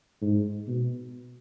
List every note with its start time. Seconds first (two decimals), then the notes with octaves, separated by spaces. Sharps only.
0.21 G#2
0.68 B2